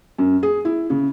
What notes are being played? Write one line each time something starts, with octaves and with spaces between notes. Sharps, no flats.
F#2
G#4
E4
C#3